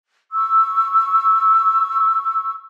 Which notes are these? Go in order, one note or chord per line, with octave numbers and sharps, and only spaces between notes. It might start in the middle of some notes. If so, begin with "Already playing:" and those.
C#6 E6